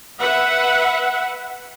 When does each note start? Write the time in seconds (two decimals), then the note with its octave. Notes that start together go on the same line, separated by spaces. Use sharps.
0.20 B4 E5 F#5